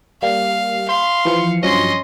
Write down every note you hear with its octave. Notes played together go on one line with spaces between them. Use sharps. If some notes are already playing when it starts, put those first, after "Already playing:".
G3 A#3 F5
F5 C6
E3 F3 C#7
G2 F3 F#3 C#4 D#5 C6